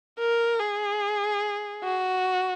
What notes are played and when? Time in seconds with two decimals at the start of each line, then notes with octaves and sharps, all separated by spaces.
0.19 A#4
0.59 G#4
1.84 F#4